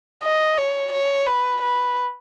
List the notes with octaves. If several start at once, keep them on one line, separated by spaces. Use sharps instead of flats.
D#5
C#5
C#5
B4
B4